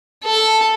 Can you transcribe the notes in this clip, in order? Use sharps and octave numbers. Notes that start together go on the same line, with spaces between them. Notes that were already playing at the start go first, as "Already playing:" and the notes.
A4